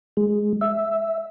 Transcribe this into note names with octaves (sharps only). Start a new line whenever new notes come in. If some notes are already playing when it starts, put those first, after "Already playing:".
G#3
E5